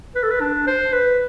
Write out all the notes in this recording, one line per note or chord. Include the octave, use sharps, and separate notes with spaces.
B4
A4
B4
D4
C5
B4